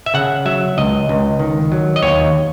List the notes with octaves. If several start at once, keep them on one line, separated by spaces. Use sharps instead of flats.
E5
C#3 F#5
F#3 E5
C#2 D#5
C#2
D#3
F#3
D#5
D#2 C#5